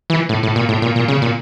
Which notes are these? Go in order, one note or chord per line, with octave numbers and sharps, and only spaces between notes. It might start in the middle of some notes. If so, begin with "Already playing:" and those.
E3
A2
A2
A#2
A2
A#2
A#2
C#3
A#2